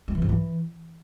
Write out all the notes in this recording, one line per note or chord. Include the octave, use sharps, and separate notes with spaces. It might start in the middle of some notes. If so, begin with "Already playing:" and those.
G#3
E3
G#2
E3